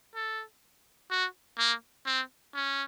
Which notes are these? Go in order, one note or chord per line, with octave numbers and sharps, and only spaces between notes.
A4
F#4
A#3
C4
C#4